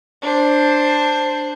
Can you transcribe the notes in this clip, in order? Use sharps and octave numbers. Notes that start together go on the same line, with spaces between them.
D4 C5